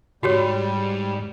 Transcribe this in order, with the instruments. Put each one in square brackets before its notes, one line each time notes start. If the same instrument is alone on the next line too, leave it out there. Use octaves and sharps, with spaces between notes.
[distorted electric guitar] C#2 G#2 [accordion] G3 [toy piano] F#4 G4 C#5